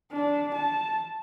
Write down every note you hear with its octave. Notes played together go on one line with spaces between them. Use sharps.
D4
A5